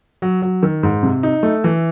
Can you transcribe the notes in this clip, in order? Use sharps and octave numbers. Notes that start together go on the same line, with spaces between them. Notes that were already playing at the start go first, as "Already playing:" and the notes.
F#3
F#3
D#3
G#2
C3
D#4
A3
E3